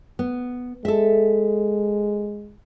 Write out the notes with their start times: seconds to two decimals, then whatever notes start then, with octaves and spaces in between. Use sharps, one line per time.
0.19 B3
0.85 G#3 A4 E5